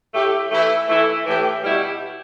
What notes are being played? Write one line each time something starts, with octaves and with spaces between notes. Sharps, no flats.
A2 A3 G4
E3 A3 E4
E3 A3 E4
A2 E3 A3 G4
B2 G3 E4 G4